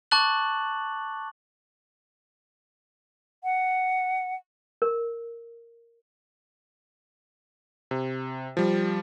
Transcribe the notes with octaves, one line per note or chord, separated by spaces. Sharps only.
A5 C#6 D6 F#6 A6 F#7
F#5
A#4
C3
F3 G3